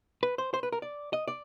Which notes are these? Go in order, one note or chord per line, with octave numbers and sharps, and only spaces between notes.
B4
C5
C5
B4
A#4
D5
D#5
D5